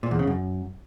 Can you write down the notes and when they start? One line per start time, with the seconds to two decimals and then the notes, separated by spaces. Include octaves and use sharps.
0.03 A#2
0.11 E2
0.19 C#3
0.27 F#2